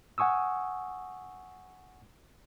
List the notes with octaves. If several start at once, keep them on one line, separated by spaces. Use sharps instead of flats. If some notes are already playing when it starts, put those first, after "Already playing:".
F#5 G#5 C#6 D#6 E6